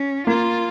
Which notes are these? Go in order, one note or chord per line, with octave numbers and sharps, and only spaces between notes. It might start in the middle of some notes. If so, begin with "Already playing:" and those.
Already playing: C#4
A#3 F4